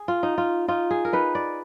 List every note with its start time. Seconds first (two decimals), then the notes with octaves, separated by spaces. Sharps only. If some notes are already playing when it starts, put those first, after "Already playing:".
Already playing: G#4
0.08 F4
0.23 D#4
0.38 F4
0.68 D#4 F4
0.91 G#4
1.05 A#4
1.13 D#4 B4
1.35 D5